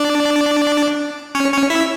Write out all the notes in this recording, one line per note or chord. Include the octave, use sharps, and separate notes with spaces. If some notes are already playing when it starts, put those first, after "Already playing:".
Already playing: D4 D5
C#4 C#5
C#4 C#5
E4 E5